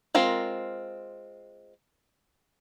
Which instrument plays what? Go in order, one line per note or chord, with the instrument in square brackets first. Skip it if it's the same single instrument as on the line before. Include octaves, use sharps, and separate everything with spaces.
[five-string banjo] G#3 C4 F4 A#4